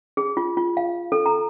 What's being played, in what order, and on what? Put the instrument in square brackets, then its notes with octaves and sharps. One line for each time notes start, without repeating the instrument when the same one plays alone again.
[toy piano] G#4
F4
F4
F5
A4
A#5